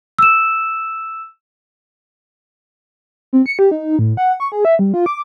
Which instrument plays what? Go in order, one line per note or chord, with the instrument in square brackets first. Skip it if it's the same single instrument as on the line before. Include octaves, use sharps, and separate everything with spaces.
[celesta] E6 E7
[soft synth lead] C4
C#7
G4
D#4
A2
F#5
C#6
G#4
E5
G3
F4
D6